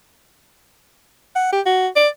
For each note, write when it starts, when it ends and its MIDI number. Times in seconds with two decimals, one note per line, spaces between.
1.36 1.50 78
1.52 1.61 67
1.66 1.88 66
1.96 2.08 74